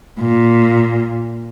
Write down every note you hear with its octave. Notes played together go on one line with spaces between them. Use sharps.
A#2